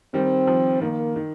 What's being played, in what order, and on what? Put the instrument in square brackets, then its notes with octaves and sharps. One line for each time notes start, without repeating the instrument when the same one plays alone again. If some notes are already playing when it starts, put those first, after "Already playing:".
[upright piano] D#3 G3 [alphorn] C4
[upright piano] F3
[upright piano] D#3 [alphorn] A#3
[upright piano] D#3